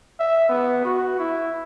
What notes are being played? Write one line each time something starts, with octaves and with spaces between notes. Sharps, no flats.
E5
B3
F#4
E4